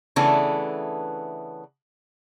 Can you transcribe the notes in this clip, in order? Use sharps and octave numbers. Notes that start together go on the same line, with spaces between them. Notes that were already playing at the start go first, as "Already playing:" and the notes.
C#3 E3 A3 B3 D4